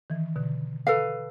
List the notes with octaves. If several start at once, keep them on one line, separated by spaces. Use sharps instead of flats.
D#3 E3
B2 D3
A4 B4 F5